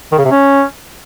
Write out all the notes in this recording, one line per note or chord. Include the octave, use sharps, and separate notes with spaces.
D#3
C#3
C3
C#4